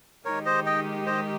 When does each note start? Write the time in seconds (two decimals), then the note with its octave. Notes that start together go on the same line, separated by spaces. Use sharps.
0.25 D#3 G#3 D#4 G4 A#4 C#5
0.45 C5 D#5
0.66 D#5 G5
1.06 C5 D#5